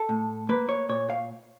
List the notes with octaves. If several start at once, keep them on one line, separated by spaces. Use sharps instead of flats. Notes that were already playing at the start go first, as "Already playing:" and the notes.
Already playing: A4
A2
A#3 B4
C#5
A#2 C#5
F5